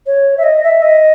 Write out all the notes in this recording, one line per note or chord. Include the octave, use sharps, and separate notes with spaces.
C#5
E5
D#5
E5
D#5